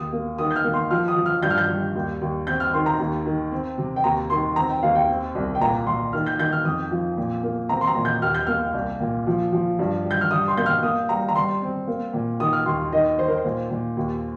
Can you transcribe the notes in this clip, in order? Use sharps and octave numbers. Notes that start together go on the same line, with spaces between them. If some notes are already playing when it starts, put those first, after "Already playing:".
Already playing: D#2 D#6
A#3
D#3 D#6
G6
F6
A#3
C6
F3 F6
D#6
F3
F6
G2 G6
F6
G6
G3
D#2
D#2
C4 G6
F6
D#3 C6
A#5
D#2
D#3
C4
C3
G5
D#2 A#5
D#3 C6
C4 A#5
G5
D#2 F5
G5
C4
C2
G5
A#2 A#5
A#2 C6
D#3 F6
G6
D#3 G6
F6
F2 D#6
F3
A#2
A#3
C4 A#5
C6
A#5
A#2
G6
D#2 F6
G6
A#3 F6
C2
A#2
F3
F3
G2
G3
G6
F6
G3 D#6
C6
A#3 G6
F6
A#3 D#6
G3 A#5
A#5
G3 C6
C4
A#3
A#2
D#3 D#6
F6
D#2 C6
D#3 D#5
D#3 C5
A#4
C5
A#2
A#2
D#2